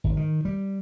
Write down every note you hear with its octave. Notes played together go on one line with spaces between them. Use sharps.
G#1
D#3
G3